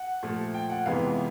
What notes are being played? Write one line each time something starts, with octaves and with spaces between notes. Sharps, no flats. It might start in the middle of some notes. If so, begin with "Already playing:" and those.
Already playing: F#5
A#2 F3 A3
G5
F#5
F2 C3 E3 G#3 B3 F5